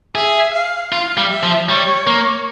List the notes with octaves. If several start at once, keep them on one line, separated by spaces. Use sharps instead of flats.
G#4 E5
F5
F4 F5
G3
E5
F3
G3 C#5
A#3